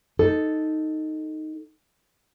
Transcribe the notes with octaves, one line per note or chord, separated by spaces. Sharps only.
D#4 A4